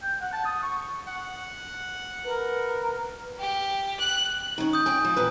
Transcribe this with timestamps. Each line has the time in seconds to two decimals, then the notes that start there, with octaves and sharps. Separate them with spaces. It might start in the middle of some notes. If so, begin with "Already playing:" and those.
0.03 G5
0.22 F#5
0.33 A5
0.45 D#6
0.63 C#6
1.07 F#5
2.26 A#4 B4
3.39 G4
4.00 F#6
4.58 D#3 C#4
4.73 D#6 G6
4.86 C#4 G5 G#5
5.04 F3
5.16 E2 A#2 B4